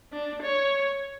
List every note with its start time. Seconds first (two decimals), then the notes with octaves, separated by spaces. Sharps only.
0.13 D4
0.42 C#5